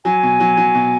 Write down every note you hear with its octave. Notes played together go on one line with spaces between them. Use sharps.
F#3 G#5
B2
F#3
F#3
B2